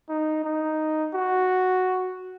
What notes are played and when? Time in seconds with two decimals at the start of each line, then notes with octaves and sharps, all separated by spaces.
0.09 D#4
0.44 D#4
1.13 F#4